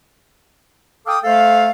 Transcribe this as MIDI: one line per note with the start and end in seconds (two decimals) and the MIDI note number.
1.06 1.19 69
1.06 1.19 77
1.06 1.19 79
1.06 1.19 86
1.06 1.19 87
1.24 1.70 57
1.24 1.70 69
1.24 1.70 72
1.24 1.70 77